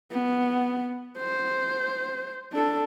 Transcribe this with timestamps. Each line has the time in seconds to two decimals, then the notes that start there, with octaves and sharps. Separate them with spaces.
0.12 B3
1.18 C5
2.53 D4 A4